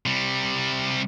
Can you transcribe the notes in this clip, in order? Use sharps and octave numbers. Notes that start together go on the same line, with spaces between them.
C3 G3